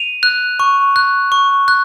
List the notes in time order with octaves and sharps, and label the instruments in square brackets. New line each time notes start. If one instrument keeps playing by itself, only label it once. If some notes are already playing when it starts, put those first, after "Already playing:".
Already playing: [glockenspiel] D#7 F7
F#6
C#6
F#6
C#6
F#6